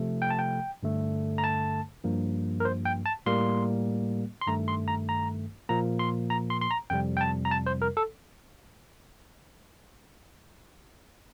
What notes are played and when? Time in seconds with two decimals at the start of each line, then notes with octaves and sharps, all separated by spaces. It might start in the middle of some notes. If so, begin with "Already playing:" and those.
Already playing: C3 F3 A3
0.22 G5
0.30 A5
0.39 G5
0.83 G2 D3 A3
1.38 A#5
1.44 A5
2.04 G2 F3 A#3
2.60 A#4
2.65 C5
2.86 G5
3.06 A5
3.26 A2 G3 A#3 C6
4.41 C6
4.47 G2 D#3 A3 A#5
4.68 C6
4.88 A#5
5.09 A#5
5.69 A#2 F3 A#3 A#5
5.99 C6
6.30 A#5
6.50 C6
6.61 C6
6.71 A#5
6.90 F2 C3 G3 G5
7.17 G5
7.21 A5
7.45 A#5
7.51 A5
7.66 C5
7.82 A#4
7.97 A4